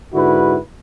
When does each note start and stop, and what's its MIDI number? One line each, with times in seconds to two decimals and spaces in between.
0.14 0.58 44
0.14 0.58 50
0.14 0.58 64
0.14 0.58 66
0.14 0.58 71